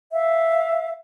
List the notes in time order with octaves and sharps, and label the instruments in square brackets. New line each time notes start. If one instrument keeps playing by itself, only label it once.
[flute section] E5 F5